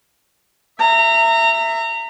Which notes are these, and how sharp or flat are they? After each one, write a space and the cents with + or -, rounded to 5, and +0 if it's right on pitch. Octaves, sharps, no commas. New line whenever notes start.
E5 +10 A#5 -25